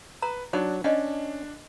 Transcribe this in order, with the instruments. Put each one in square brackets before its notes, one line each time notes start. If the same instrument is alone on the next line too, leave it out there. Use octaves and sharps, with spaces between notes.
[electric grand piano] B4 [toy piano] A#5
[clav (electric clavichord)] F#3 [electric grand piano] D4 [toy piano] D#4 F#5
[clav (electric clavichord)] C#4 [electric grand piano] D4 [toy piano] D#5 F#5